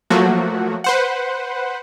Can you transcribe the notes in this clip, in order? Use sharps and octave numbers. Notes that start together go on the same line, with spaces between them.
F3 F#3 A3 A#3 F#4
B4 C5 F#5